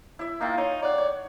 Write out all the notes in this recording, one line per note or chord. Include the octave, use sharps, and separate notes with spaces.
E4 E5
A#3 D#4 F4 G5
D#4 C#5
C#5 D5 F#5
C#5